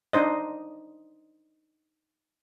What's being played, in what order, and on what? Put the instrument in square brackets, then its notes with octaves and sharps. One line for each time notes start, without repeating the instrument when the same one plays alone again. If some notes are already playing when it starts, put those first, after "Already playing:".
[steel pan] D4 D#4 C5 D#5